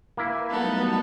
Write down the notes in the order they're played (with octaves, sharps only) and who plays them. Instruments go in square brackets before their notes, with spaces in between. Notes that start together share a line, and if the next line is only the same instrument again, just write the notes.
[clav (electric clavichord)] A#3 E4 [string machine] B4 E5 G#5
[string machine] F#3 G3 A3 [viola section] B3 [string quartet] D#4 A4